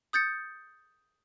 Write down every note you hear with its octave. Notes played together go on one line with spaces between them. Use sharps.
D#6 G6 A6 C#7